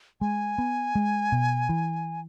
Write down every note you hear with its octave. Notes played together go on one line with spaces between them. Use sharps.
G#3 G#5
B3
G#3
B2
E3